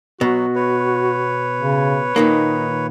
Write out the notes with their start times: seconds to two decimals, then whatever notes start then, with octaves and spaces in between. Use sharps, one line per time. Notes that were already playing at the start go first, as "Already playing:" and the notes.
0.21 B2 F#3 F#4
0.55 B4 C#5
1.61 C#3
2.16 A#2 D#3 A#3 D#4